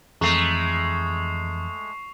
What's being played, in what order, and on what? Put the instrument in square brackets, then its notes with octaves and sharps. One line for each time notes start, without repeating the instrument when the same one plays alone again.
[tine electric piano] F2 E3 A#5 [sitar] G#3 A3 [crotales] C#6 C7 F7